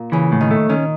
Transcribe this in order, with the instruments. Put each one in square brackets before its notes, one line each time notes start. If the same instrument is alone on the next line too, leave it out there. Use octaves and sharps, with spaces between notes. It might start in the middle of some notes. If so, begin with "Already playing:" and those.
Already playing: [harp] A#2
[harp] C#3 [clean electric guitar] E3
[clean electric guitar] A2
[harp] D#3
[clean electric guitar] A3
[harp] D#3 [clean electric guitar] C#4